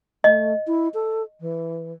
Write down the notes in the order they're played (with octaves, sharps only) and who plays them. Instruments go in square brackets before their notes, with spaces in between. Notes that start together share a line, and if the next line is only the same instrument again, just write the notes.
[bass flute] A3 [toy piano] D#5
[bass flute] E4
A4
E3